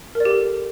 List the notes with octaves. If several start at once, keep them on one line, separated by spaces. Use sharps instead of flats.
A#4
D5
G4
A4